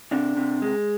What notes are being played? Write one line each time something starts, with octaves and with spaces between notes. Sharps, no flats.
C3 D4
C3
G#3